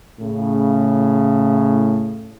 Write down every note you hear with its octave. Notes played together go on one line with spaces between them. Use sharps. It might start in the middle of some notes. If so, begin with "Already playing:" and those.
A2 C#3